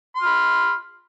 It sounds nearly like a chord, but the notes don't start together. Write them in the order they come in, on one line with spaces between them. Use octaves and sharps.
C6 F6 B5